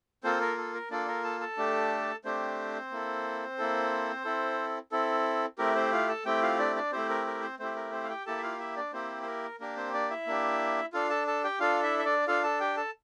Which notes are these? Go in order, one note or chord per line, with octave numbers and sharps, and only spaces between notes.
A#3 C4 F4 A4 C5
A#4
A4
A#4
A#3 D4 F4 A4 D5
A#4
A4 A5
A4 A5
A3 D4 G4
A3 C4 D4 G4 C5
A#3 E4 A4
A#3 E4 A4
C4 E4 A4
C4 E4 A4
A3 C4 E4 G4 A#4
C4 C5
F4 F5
A4 A5
A3 C4 E4 G4 G5
F4 F5
D4 D5
D4 D5
A3 C4 E4 G4 C5
A#4
A#4
C4 C5
A3 C4 E4 G4 C5
A#4
C4 C5
F5
G4 G5
A#3 E4 G4 A4 A5
E5
F4 F5
E4 E5
D4 D5
A#3 C4 E4 G4 C5
C5
A#4
A#3 D4 G4 A#4
C4 C5
D4 D5
E4 E5
A#3 D4 G4
D4 F4 A4 F5
A4 A5
A4 A5
G4 G5
D4 F4 A4 F5
E4 E5
E5
D4 D5
D4 F4 A4 F5
A4 A5
G4 G5
A4 A5